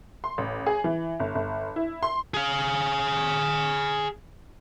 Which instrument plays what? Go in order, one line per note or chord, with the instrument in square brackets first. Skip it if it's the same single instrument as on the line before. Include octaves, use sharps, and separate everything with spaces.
[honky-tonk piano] C6
A1
G#4
E3
G1
G1
E4
C6
[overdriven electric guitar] G#4 F5